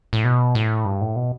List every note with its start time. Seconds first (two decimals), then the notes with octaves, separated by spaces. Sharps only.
0.13 A2
0.24 B2
0.55 A2
0.85 G2
1.01 A2
1.16 B2